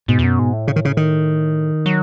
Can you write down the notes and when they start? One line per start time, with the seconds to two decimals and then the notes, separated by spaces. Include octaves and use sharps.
0.08 G#2 B2
0.19 E2
0.23 F#2
0.39 G#2
0.53 A2
0.68 C#3
0.76 D#3
0.85 C#3
0.97 D#3
1.86 F#3